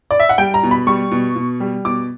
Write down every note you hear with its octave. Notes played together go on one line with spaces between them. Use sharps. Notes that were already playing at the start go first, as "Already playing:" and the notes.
D5
E5
F#5
G3 G5
A#5
B2
B5
G3 C#6
B2
B2
G3
B2 D6